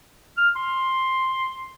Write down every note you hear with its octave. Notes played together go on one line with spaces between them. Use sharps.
F6
C6